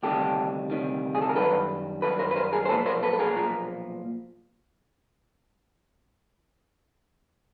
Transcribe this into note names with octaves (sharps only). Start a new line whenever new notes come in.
D2 C3 D#3 G3 G4 A4
D2 C3 D#3 G3
G#4
A4
A#4
F#2 D#3 G3 A4 B4
F#2 D#3 G3 A4 B4
A#4 C5
B4
A#4 C5
G#4 A#4
C5
B1 A#2 F3 A4 B4
A#4 C5
A4 B4
A4
G#4 A#4
B1 A#2 F3